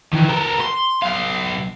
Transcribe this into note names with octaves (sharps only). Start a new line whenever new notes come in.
D#3 E3
A4 A#4
C6
B1 F5